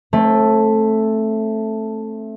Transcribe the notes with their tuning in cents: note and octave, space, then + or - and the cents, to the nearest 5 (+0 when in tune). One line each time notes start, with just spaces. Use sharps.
A3 +0 C4 +40